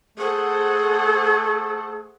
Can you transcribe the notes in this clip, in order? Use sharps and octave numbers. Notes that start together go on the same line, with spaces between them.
A3 G#4 A4 C5 F#5